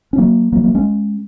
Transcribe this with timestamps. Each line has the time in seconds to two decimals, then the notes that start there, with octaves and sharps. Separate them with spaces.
0.13 C#4
0.18 F#3 A#3
0.53 F#3 A#3
0.64 F#3 A#3
0.75 G#3 C#4